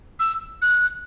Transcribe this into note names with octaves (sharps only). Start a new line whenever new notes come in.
E6
F#6